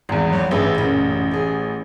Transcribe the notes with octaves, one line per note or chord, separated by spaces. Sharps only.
G#1 E2 G2
F#3
A1 G2 E4 G#4 B4
F#2 A#2 C#3
E3 G#4